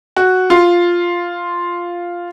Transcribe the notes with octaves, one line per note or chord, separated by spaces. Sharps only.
F#4
F4